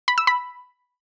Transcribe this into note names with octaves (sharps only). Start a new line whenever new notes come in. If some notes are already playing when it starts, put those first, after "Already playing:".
B5
E6
B5